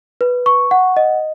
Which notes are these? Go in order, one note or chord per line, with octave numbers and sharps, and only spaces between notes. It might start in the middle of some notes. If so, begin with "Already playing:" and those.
B4
C#6
F#5
D#5